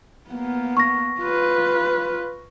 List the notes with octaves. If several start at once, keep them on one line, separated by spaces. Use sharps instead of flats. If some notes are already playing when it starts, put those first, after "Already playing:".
A#3 B3
C#6 A#6
F4 B4